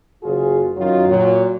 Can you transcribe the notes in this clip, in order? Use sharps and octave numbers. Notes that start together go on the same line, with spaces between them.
F#1 F4 F#4 G#4
F#2 D#3 F#3 F4
A#2 F#3